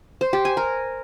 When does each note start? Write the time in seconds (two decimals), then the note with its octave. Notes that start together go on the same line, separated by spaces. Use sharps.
0.21 C5
0.33 G4
0.45 G#5
0.57 A#4